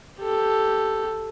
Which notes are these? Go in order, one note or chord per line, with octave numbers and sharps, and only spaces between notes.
G4 A4